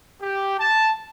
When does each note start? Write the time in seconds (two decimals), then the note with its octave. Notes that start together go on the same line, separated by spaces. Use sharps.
0.22 G4
0.59 A5